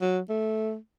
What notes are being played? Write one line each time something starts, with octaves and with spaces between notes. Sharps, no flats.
F#3
A3